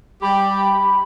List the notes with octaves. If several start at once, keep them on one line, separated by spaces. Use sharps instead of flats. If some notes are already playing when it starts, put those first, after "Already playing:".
G3 G4 B5